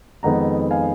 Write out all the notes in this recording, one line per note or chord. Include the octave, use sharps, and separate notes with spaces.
F2 D#3 G#3 B3 D#4 F#5 A#5
F5 G#5